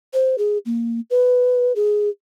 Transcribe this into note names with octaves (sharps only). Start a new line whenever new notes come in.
C5
G#4
A#3
B4
G#4